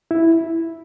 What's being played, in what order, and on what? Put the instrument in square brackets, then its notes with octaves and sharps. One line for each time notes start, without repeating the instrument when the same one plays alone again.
[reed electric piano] E4